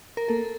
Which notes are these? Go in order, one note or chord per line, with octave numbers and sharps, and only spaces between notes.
A#4
A#3 A4